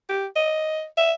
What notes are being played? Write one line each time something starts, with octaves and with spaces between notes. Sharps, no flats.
G4
D#5
E5